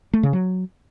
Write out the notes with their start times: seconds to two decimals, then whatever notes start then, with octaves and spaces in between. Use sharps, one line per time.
0.13 A3
0.23 C#3
0.33 F#3